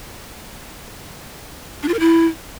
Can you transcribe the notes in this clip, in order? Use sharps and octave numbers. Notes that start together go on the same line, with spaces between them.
D4
F4
A#4
E4